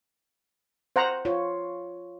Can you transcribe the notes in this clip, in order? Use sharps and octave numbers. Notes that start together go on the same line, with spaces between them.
C5 F#5 A#5
F4 C#5